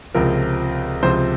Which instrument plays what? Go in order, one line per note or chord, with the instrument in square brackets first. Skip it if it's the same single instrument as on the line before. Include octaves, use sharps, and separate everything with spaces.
[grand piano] C#2 C3 F3 A#4
C#2 C3 F3 C5